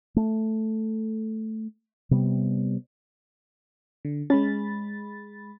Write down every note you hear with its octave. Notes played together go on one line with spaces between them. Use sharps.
A3
C3 G3 B3
D3
G#3 C#4 B5 A6